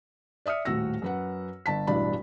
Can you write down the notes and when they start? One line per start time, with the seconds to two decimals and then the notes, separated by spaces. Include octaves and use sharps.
0.46 D5 E5 D#6 F6 C#7
0.65 D#1 A2 F#4 E6 A#6
1.02 F#2 B4 F#5
1.66 G1 A5 B6
1.87 E1 A1 G2 D4 D5 B5